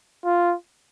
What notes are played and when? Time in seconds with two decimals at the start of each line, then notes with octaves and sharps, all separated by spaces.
0.25 F4